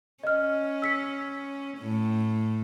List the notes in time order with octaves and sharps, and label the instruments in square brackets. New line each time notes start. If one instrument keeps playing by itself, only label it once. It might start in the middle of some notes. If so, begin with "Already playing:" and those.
[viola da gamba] C#4 [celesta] D#5 F6
[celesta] E6 B6 C#7
[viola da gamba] A2